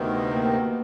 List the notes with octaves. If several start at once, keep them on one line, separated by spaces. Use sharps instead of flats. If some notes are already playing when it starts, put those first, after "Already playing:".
Already playing: D2 C3 D#3 B3
A#3